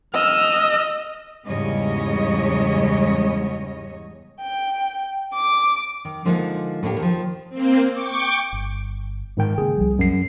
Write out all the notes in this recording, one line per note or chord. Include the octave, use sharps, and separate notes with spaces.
D#5 E6 F6
E2 G#2 C#3 G3 C#5 D#5
G5
D6
D#3
D3 F3 G#3 A#3 B3 D#4
A2 A#3 D4 G4
D#3 F3
A#3 C4
G5 C#6 D6
G1
G#2 D#3 G5
C#3 A#3 G#4
C2 F3 G3
F#2 C7